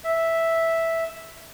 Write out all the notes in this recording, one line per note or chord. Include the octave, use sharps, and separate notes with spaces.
E5